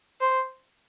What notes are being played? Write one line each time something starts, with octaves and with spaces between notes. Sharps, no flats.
C5